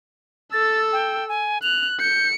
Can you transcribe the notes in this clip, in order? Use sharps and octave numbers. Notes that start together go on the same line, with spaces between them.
A4 E6 A6
G5
G#5
F#6 F7
G6 C#7